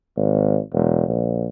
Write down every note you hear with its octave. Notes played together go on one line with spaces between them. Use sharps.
G#1
E1
A#1